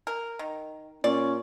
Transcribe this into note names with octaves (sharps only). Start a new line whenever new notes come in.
A#4
D#3
A#2 C#4 D5